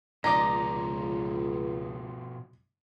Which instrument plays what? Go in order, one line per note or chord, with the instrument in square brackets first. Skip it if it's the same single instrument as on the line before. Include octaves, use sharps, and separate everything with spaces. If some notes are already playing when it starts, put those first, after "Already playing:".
[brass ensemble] C#2 [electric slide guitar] B2 F3 [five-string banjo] D#4 D5 [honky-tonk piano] D6 A#6